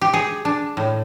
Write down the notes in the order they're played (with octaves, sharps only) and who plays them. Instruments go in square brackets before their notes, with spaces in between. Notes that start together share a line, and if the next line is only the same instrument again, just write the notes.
[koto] G4
G#4
D4
A2